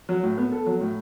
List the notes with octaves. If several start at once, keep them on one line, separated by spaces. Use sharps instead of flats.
F#3
A2
B3
A4
F#3
A2